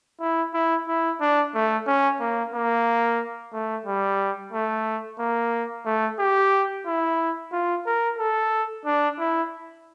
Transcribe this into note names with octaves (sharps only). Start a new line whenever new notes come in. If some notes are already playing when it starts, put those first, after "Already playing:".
E4
E4
E4
D4
A3
C#4
A#3
A#3
A3
G3
A3
A#3
A3
G4
E4
F4
A#4
A4
D4
E4